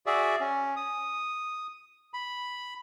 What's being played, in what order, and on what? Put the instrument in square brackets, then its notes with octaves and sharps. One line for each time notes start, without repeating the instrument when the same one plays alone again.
[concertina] F#4 G#4 D5 E5
C#4
D#6
B5